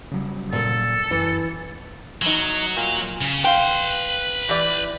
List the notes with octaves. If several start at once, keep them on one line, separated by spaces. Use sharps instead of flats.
C#3 F#3 G3
A#2 A4 A#4
F#2 E3
E2 F#3 D#4
A#2
C#3
B4 F5 G5 C6
E3 G4 D5